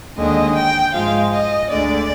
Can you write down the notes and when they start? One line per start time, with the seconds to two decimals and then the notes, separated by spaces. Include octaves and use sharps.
0.17 D#2 D3 G#3 D#5
0.55 G5
0.93 G#2 F3 G#3 F5
1.32 D#5
1.69 D2 D3 G#3 D5